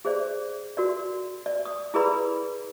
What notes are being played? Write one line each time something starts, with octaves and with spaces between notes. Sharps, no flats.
G#4 C5 D5
F#4 A#4 D5
D5
D#6
E4 G#4 A#4 B4 D5 B5